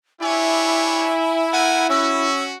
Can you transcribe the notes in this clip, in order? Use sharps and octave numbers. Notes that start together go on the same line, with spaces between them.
D4 E4 G4 C#5 G#5
A3 A#4 F#5 G#5
C#4 F#4 E6